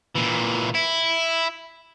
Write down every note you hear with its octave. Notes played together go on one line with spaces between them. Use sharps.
A#2 E3
E4